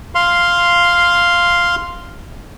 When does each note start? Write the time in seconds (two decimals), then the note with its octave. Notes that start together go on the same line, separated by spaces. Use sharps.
0.15 F5 C6